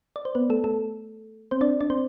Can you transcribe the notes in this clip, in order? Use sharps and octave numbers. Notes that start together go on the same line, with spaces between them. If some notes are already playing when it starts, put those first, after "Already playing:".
D5
C5
B3 B4
A3 A4
A3 A4
C4 C5
D4 D5
D4 D5
C4 C5